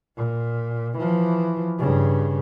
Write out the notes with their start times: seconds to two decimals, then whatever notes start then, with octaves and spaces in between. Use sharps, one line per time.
0.17 A#2
0.97 E3 F3
1.79 G2 C#3